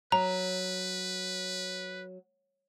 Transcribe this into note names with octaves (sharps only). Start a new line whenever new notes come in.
F#3 B4 A#5